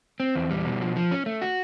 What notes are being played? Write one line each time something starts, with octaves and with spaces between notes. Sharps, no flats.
C4
E2
G3
B2
F3
F3
C#4
A3
F#4